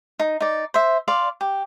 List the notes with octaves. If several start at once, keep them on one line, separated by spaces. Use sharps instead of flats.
D#4
D#4 D5
C5 E5
D5 F5 C6
G4